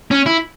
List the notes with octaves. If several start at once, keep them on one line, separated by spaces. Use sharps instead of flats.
C#4
E4